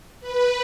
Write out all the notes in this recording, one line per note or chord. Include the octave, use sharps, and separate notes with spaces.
B4